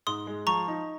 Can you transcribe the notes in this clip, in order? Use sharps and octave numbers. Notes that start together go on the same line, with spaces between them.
G#2 C6 D#6
G#3
F3 A#5 C#6
D#4